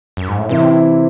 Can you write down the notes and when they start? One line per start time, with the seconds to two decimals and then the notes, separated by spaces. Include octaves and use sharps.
0.17 F#2
0.28 G#2
0.38 A2
0.49 C3 E3 C4 E4